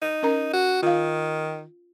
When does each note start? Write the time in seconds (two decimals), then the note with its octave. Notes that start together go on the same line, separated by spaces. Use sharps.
0.02 D#4
0.23 C#4 A#4 A#5
0.53 F#4
0.82 D#3 F4 F5